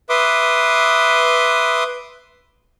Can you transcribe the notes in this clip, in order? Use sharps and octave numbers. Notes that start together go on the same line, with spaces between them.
B4 E5 C6 D6 D#6